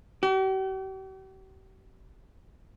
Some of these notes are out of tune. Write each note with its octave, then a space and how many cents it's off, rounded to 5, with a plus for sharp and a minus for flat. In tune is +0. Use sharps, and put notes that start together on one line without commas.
G4 -45